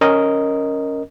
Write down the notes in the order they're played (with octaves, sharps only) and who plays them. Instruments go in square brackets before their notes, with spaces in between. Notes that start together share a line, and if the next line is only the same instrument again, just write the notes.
[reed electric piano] C#4 A#4 D#5